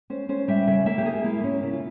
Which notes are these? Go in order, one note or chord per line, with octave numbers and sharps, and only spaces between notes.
C#4 C5
C#4 C5
G3 E5
C#3 E5
A#3 E5
G4
A#3 G#4
A#3 E4
A#3 C#4
C#3 E4
F4